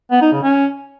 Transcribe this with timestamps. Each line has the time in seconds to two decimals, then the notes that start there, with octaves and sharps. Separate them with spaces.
0.11 B3
0.22 D#4
0.32 C#3
0.43 C#4